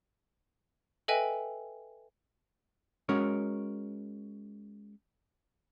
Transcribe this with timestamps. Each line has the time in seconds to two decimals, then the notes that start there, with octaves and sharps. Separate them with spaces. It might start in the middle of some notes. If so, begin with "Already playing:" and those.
1.08 A4 B4 D#5 E5 G5 G#5
3.09 G#3 C#4 F#4 A#4 C#5